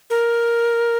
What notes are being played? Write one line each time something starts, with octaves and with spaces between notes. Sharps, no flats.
A#4